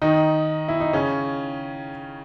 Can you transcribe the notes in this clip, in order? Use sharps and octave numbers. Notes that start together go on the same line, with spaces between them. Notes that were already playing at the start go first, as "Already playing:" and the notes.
D#3 D#4
E4
D#4
C#3 C#4